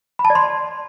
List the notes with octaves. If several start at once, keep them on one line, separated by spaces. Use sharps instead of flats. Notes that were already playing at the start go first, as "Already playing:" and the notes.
B5
A5
D5
C6